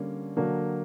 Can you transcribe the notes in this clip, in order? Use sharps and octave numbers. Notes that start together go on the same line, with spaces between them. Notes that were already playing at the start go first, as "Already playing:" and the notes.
Already playing: D3 G3 A#3 C#4
D3 F#3 A#3 D4